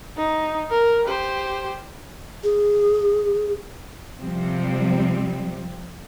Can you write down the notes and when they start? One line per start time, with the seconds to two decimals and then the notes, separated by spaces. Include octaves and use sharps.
0.17 D#4
0.71 A#4
1.05 G4 C5
2.44 G#4
4.21 C3 F3 G3 C4